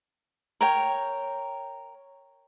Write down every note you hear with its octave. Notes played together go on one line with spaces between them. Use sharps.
A#4 C#5 G5